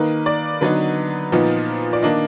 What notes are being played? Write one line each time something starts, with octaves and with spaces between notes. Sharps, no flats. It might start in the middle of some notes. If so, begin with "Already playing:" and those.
Already playing: D#3 A#3 D#4 B4
D5
D3 F#3 B3 D#4 B4
A#2 F3 B3 D#4
D5
D#3 A#3 D4 D#5